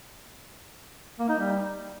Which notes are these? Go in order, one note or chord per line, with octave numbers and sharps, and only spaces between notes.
A#3
D#4
G3